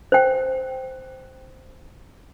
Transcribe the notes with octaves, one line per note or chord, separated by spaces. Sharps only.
C5 G5